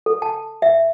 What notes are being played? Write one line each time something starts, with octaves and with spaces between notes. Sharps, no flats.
A4
A5
E5